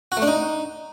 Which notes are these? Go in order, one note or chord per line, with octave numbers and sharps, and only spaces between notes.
F#4
A3
D4
D#4